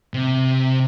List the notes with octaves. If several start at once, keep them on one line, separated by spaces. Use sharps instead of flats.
C3